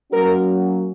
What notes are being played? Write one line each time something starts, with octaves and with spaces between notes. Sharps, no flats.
F#3 A#3 C#4 F#4 A#4